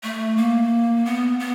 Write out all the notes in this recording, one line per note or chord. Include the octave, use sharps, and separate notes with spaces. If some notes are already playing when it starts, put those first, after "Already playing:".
A3
A#3
B3
B3